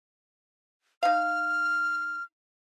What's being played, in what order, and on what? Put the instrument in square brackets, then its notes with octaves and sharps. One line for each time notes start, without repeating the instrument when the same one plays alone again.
[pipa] D#4 F5 [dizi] F6